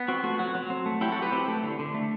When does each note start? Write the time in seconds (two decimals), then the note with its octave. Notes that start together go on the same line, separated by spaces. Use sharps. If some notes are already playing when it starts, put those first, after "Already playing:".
Already playing: B3
0.08 C4 F#4
0.23 A3 F#4
0.39 F#3 F#4
0.55 F#3
0.70 C4
0.86 A3
1.01 F#3 E4 G4
1.12 F#3 F#4 A4
1.22 G4 B4
1.32 C4 E4 G4
1.48 A3
1.63 D3
1.79 D3
1.94 A3